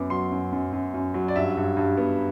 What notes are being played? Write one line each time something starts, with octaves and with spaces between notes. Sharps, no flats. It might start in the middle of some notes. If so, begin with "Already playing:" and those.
Already playing: F#2 B3 D6
F#3 C6
F#2
F#2
F#2
F#2
F#3
D5
G2 E5
G2
G2
B3